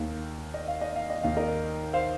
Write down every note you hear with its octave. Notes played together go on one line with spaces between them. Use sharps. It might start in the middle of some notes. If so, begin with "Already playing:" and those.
Already playing: D#2 D#3 F5
D#5
F5
D#5
F5
D#5
D#2 D#3 F5
A#4 D#5
C5 F5